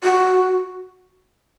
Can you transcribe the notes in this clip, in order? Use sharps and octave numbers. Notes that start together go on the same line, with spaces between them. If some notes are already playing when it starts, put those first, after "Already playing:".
F#4